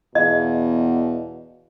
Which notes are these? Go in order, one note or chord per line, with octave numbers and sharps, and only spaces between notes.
E2 B2 G#4 D#5 F5